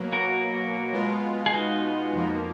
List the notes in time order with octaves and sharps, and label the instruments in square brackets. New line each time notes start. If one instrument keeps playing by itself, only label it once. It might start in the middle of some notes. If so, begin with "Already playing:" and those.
Already playing: [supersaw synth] B2 F#3 A#3
[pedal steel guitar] F#4 A#4
[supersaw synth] B2 G#3 B3 F4
[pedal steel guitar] G#4
D#4 F#4
[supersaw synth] F2 F3 A#3